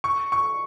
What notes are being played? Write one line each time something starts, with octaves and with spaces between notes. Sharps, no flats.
C#6
C#6